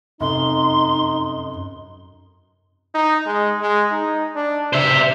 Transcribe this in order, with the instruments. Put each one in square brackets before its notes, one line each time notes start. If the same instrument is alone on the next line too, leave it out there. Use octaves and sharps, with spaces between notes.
[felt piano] F1 [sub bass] F#2 [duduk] D#4 [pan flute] C6
[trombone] D#4
G#3
G#3
D#4
D4
[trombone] G2 [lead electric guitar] C5 E5